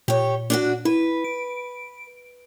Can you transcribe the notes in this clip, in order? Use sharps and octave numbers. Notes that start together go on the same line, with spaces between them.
A#2 G4 C#5
D4 F4 F#4
E4 B4
D7